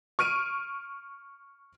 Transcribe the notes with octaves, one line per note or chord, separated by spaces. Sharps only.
C#6 F6 D7 D#7